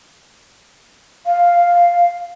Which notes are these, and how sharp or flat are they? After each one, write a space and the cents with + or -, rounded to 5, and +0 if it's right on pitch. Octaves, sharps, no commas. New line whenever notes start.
F5 +0